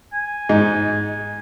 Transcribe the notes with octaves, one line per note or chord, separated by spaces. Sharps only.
G#5
G#2 D#4